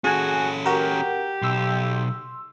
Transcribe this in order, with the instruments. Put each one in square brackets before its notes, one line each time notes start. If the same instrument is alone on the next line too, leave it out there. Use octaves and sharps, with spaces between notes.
[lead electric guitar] C#4 A4 [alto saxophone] F#4 [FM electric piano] G#4 G#5
[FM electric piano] F#4 A#4 [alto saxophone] G4
[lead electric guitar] B1 [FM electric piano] C6 E6